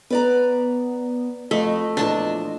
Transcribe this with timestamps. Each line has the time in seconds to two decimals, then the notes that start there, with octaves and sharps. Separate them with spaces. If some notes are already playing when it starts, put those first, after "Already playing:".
0.10 B3 B4 D5 A#5
1.51 F2 A3 D#5
1.97 E2 A#2 F3 D4 A5